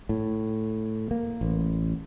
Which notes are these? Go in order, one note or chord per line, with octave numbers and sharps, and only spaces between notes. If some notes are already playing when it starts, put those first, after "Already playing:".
A2
A#3
A1